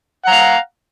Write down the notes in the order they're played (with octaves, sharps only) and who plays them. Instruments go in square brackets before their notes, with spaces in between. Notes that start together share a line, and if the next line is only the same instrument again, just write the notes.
[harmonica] F#5
A#5
F5